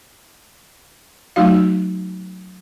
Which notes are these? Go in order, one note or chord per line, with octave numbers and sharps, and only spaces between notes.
F#3 A3 D#4 F#4 F5